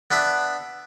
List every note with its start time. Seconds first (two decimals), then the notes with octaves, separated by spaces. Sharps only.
0.11 B3 D4 B4 E5